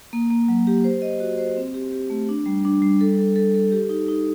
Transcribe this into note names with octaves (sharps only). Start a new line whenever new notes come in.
A#3
A#3
F#3
G4
C5
D#5
F#4
C5
C4
G4
G4
A3
D4
G3
D4
G3
A4
A4
A4
A4
G4
D#4
D#4